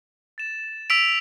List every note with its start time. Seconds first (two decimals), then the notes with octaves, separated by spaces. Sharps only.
0.38 A6 E7
0.90 E6 B6 D7 F7